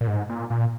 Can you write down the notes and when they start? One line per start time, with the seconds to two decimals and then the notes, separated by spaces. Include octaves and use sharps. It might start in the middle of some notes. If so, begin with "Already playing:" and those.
0.01 A#2
0.07 G#2
0.29 A#2
0.50 A#2